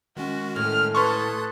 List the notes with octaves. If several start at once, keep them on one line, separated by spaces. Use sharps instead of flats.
D#3 G#3 C#4 F#4
A2 F6
A4 B4 C6 C#6 D#6 F#6 G#6